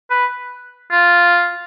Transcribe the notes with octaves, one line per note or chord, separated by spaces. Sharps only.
B4
F4